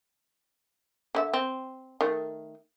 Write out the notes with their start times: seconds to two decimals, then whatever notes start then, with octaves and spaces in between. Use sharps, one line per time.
1.15 D3 E4 E5
1.34 C4
2.01 D#3 A3